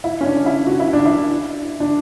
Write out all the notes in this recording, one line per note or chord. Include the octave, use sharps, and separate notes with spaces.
E4
C#4
D4
E4
F#4
E4
D4
E4
D4